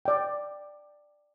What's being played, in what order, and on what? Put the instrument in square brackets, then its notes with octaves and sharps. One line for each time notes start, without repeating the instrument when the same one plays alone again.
[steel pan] D5 G5